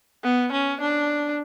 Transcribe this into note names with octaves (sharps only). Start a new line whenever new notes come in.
B3
C#4
D4